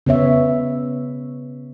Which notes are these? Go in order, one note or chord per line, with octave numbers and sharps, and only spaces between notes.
C#3 B3 C#5 E5